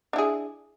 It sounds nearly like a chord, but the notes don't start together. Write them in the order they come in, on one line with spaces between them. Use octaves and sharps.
D4 E4 G#4